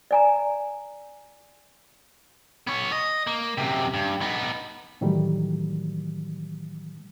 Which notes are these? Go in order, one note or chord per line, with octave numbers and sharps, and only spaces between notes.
D5 G#5 A#5
B3 C#5
D#5
A#3
F#2 C3
G2
B3 D#4
A2 D#3 E3 F#3 G3 A3